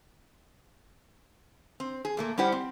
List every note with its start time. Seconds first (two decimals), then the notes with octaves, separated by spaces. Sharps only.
1.80 C4
2.05 G#4
2.17 A#2 A3 A#3
2.38 G3 C#4 E4 G4 C5 F#5
2.52 C4